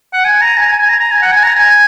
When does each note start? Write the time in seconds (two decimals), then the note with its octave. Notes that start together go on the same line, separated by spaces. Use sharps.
0.13 F#5
0.25 G#5
0.41 A#5
0.57 G#5
0.68 G#5
0.79 G#5
0.89 A#5
1.00 A#5
1.11 G#5
1.22 F#5
1.32 G#5
1.43 A#5
1.55 G#5